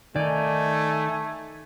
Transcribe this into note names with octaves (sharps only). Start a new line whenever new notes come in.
D#3 A3 D#4 D5 G#5